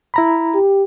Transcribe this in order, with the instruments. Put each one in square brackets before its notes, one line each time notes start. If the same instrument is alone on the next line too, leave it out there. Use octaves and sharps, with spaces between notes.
[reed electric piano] E4 A#5 B5
[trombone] G4